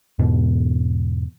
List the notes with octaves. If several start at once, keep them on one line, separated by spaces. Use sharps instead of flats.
E2 G#2 B2